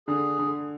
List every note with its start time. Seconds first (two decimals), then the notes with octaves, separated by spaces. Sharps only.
0.07 D3 G#4
0.39 D3